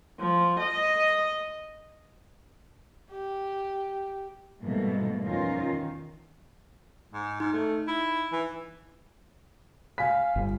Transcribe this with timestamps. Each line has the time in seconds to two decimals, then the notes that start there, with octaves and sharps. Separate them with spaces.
0.20 F3
0.60 D#5
3.11 G4
4.62 G#2 B2 E3 G3 A3 A#3
5.25 E2 F3 C#4 D#4 F4 A#4
5.62 D#3
7.13 G#2
7.40 G#2 D#4
7.53 A3
7.87 E4
8.32 E3
9.98 F5 G#5 B6
10.36 G1